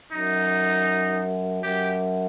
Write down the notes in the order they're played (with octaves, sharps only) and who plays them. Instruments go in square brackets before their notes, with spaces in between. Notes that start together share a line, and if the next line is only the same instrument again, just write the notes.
[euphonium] F#2 [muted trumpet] D#4
[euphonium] F#2 [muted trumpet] G4